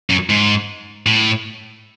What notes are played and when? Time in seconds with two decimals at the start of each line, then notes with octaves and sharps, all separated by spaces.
0.10 F#2
0.30 G#2
1.06 A2